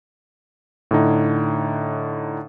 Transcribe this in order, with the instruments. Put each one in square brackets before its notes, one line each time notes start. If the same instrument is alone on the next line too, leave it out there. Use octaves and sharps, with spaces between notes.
[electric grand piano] A2 D3 D#4